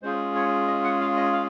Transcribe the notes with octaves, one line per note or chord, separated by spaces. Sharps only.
G#3 C#4 F4 G#4 C5
C#5
D#5
F#5
F5
D#5
F5